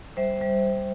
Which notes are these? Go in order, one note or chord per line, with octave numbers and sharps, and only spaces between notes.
G3 C5 E5
G3